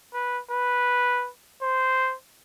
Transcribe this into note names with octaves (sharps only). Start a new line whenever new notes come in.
B4
B4
C5